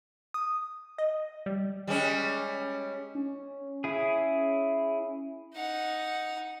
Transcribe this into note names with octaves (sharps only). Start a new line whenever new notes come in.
D#6
D#5
G3
G3 G#3 C#4
C#4
E4 G#4
D#4 F#5